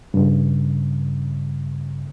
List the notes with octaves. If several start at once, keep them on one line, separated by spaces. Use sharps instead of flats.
G2 C#3